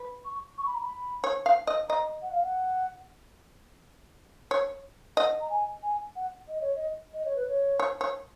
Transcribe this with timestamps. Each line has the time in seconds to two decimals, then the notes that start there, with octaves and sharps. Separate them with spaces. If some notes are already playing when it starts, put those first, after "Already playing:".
Already playing: B4
0.25 C#6
0.58 C#6
0.66 B5
0.74 A#5
0.82 B5
1.24 C#5
1.46 F5
1.67 D#5
1.89 D#5 A#5
2.22 F#5
2.32 F5
2.43 F#5
4.51 C#5
5.17 D#5 F#5
5.41 A#5
5.50 G#5
5.83 G#5
6.16 F#5
6.48 D#5
6.61 C#5
6.75 D#5
7.14 D#5
7.25 C#5
7.36 B4
7.47 C#5
7.80 C#5
8.01 C#5